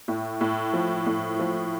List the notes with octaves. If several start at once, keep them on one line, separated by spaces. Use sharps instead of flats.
A2
A2
F3
A2
F3